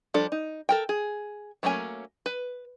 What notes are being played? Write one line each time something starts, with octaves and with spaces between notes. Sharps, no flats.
F3 G3 D4 A4
D#4
A4 A#4 G5
G#4
F#3 A3 A#3 C#4 G#5
B4